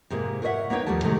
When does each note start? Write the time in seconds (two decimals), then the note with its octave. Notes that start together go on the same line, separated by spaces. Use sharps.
0.10 G#2 C3 G#3 A#3
0.42 A#4 B4 C#5 D#5 E5 F#5
0.70 A#3 B3 D#4 C#5 G5
0.86 D#2 F3 G3 A3 A5
1.02 A2 C3 D#3 G#3 A3